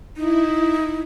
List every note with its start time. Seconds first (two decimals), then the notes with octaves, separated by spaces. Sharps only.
0.17 D#4 E4